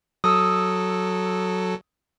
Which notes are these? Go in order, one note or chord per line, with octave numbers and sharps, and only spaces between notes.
F#3 A4 D#6 E6